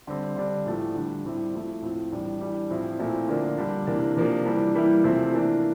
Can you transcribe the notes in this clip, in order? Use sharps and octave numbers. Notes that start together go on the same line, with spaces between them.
D3 G3 C4
D3 G3 D4
A2 F3 A3
D3 G3 D4
A2 G3 C4 E4
F3 A3 E4
A2 F3 C4
A2 E3 G3 D4
E3 G3 D4
A2 F3 C4 E4
A#2 A3 C4 E4
D3 F3 A#3 D4
D3 G3 D4
C3 E3 A#3 D4
C3 F3 A#3 D4
E3 G3 D4
E3 G3 A#3 E4
C3 F3 A3 C4 E4
E3 A#3 D4